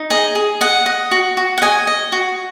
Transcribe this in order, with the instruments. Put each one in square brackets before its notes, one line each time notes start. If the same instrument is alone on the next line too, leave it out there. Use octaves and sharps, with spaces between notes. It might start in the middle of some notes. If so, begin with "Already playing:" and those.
Already playing: [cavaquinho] D#4
G#4 D#5
G#4
D#5 F#5
D#5
F#4
F#4
F#5
D#5 G#5
D#5
F#4